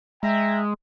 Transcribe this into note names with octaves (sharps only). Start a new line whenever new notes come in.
G#3 E5 G5 A#5